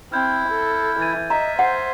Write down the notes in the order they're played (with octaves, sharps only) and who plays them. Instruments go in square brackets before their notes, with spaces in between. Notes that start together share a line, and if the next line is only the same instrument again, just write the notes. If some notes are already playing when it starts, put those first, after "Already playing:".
[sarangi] C4 [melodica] E4 [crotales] F6 G6
[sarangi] A4
[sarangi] E3 [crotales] G#6 A6 D#7
[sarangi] D#5 [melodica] E5 [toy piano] A#5
[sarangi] C5 [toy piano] F#5